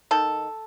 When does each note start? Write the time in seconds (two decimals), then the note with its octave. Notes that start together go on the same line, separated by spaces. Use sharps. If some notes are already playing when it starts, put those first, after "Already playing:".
0.11 D#3 A4